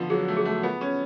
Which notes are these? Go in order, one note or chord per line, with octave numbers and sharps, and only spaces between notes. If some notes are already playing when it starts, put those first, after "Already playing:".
Already playing: D3 F3 B3
F#3 G#4
A3
G#4
A3
B3 F4
C#4